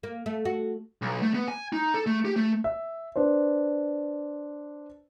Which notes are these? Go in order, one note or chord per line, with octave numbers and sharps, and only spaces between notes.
A#3
A3
F#4
B1
A3
B3
G#5
D#4
A4
A3
G4
A3
E5
D4 B4 C5